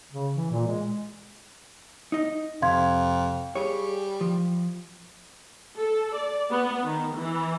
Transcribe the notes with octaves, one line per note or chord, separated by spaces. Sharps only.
C#3
E3
A#2
G#3
D#4 D#5
F2 C3 F5 C6 G#6
G3 G#4 C#5
F3
A4
D5
B3
D#3
E3